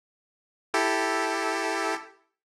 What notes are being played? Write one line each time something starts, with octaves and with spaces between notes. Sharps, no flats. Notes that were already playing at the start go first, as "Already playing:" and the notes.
E4 G4 A4